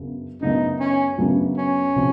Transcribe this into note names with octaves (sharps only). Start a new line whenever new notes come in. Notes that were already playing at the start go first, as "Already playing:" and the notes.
Already playing: F#2 C#3 F#3 B3 D4
F#2 C#3 F#3 B3 D4 D#4
C#4
F#2 C#3 F#3 B3 D4
C#4
C3 F3